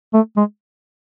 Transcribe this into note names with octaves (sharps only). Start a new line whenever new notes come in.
A3
G#3